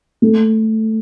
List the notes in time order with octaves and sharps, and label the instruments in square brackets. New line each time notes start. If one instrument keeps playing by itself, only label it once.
[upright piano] A3